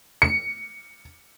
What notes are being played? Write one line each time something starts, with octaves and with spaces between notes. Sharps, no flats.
C#7